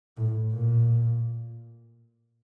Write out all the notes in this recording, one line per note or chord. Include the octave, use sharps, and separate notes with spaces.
A2
A#2